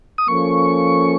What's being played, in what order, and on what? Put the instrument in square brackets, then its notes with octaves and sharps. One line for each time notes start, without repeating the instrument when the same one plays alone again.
[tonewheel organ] D#6
[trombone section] F3 A#3 C#4 A4 [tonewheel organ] C#6